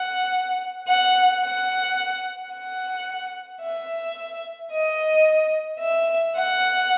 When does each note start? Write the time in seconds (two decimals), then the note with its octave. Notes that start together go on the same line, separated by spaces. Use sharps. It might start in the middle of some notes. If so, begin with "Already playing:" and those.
Already playing: F#5
0.87 F#5
1.42 F#5
2.52 F#5
3.61 E5
4.71 D#5
5.80 E5
6.36 F#5